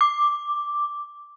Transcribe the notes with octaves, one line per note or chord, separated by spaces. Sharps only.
D6